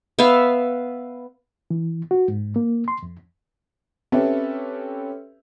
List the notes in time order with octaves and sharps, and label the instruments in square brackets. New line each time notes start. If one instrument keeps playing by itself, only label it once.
[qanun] B3 E5 F5
[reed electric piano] E3
F#4
G#2
A#3
C6
F2
[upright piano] C4 C#4 G4 A4 B4 E5